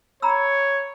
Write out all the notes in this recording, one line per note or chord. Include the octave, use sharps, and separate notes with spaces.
C#5 A#5 B5 E6